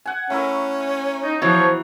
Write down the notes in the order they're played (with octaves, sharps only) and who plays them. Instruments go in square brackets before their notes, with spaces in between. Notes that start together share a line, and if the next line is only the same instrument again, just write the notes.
[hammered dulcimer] F#5 G#5
[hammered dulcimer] A3 E4 A#4 [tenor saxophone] C#4
[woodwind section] D#4
[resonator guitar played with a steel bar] B2 E3 [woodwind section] F3 C#5